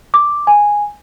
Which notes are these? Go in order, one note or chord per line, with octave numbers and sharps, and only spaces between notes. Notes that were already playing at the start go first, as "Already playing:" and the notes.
D6
G#5